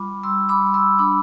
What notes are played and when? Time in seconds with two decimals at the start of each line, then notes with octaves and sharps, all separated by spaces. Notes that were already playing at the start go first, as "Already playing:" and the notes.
Already playing: G3 F4 B5 D6
0.23 G3 C6 E6
0.49 B5 D6
0.62 G3
0.74 C6 E6
0.99 D4 B5 D6